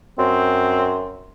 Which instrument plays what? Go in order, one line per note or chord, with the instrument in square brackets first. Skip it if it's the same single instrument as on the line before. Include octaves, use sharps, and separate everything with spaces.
[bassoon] F#2 [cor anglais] C4